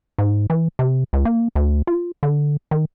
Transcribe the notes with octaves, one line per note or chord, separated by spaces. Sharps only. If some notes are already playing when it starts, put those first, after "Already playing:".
G#2
E3
C3
C#2
A#3
D2
F4
D3
D#3